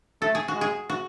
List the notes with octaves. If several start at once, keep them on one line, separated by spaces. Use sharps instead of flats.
A3 A4
G#4
F#4
G#3
G#4
F#4